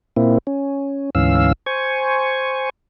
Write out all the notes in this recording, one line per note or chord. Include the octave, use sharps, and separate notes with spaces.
A#2 A#3 C4 E4
C#4
D2 G#2 E3 C#4 F5 E6
C5 G#5 C#6